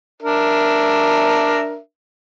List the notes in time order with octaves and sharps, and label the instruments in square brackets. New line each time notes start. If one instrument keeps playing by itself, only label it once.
[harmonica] D4 A#4 E5